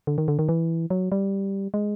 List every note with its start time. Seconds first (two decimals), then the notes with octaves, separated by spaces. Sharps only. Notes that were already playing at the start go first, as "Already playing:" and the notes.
0.07 D3
0.18 D#3
0.28 D3
0.39 D#3
0.49 E3
0.90 F#3
1.12 G3
1.74 G#3